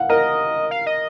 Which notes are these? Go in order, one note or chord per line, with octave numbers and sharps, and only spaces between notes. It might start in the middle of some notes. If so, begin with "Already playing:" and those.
Already playing: F5 F#5
A#4 D#5
F5
D#5